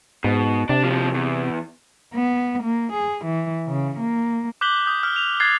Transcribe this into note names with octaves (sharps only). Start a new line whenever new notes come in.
G#2 B2
C3 D4
D#2 F3
E2
B3
A#3
G#4
E3
C#3
A#3
D6 F#6 G6 B6 F#7 G7
D#6 G6
F6
F7
F#6 G#6 A6 C7